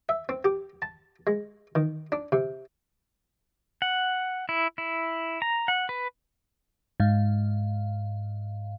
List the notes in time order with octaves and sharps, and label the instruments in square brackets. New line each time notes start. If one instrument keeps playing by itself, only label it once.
[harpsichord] E5
C4
G4
A5
G#3
D#3
D4
C3
[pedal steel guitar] F#5
E4
E4
A#5
F#5
B4
[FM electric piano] G#2 F5